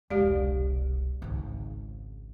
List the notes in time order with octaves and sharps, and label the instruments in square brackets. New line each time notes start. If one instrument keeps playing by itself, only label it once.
[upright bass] E1 C2 [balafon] G#3 G4 D5
[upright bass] G#1 C#2